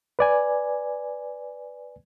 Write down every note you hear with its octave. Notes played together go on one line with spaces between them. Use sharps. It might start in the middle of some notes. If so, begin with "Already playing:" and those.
B4 D5 G#5